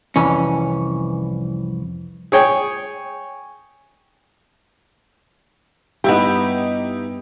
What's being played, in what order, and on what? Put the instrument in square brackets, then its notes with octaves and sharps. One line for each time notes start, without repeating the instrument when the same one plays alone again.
[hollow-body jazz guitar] C2 F2 E3 C#4
[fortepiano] G#4 C#5 G5
[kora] G2 B3 [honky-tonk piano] D#4 E4 G4